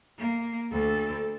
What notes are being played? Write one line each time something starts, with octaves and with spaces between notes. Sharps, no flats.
A#3
D2 A4